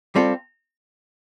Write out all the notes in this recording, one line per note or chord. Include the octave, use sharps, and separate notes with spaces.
G3 C4 F4 A4